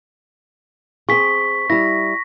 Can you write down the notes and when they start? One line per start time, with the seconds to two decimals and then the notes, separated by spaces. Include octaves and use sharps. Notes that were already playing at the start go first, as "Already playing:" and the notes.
1.09 C4 G#4 C#6 B6
1.70 G3 E4 A#6